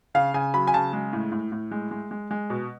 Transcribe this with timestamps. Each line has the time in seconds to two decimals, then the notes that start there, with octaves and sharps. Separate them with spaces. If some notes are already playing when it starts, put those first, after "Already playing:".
0.15 C#3 F5
0.34 C#3 G#5
0.54 F#3 B5
0.67 G#5
0.74 C#3 A5
0.93 G#3
1.13 A2
1.32 A2
1.52 A2
1.71 G#3
1.91 G#3
2.11 G#3
2.31 G#3
2.50 B2